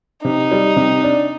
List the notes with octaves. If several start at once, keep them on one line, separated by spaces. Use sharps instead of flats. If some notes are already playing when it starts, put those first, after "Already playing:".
C3 D#4
G3
C3
D4